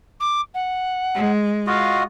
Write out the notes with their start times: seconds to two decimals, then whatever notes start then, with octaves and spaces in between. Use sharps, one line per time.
0.20 D6
0.54 F#5
1.15 G#3
1.67 F4 F#4 D#5 F5